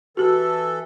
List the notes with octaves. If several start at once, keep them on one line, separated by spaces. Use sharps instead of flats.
E3 F#4 G4 A4